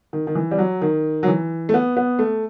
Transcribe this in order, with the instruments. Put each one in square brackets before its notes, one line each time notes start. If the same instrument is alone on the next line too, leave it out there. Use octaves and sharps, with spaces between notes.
[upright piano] D#3
D#3
E3
G3
F#3
D#3
F#3
E3
A3
B3
B3
A3